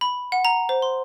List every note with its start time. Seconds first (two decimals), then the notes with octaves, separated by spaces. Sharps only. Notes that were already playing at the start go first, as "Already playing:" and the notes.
0.01 B5
0.32 F#5
0.45 A#5
0.69 C5
0.82 C6